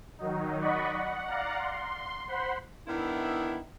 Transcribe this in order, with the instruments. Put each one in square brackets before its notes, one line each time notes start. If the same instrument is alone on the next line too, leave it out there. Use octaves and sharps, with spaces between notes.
[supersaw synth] D#3 F#3 D#4
D5 D#5 F#5 B5 C#6
F#5
D5 F5 F#5 A#5
C6
C5 F#5 B5 C6
[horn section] D#3 B3 D4 E4